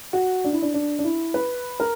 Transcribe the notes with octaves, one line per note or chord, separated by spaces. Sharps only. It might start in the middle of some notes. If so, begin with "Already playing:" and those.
F#4
D4
E4
D4
D4
D4
E4
B4
A#4